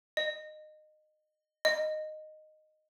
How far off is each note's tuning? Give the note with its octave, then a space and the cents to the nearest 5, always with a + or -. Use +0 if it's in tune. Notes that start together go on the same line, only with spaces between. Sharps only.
D#5 -20
D#5 -10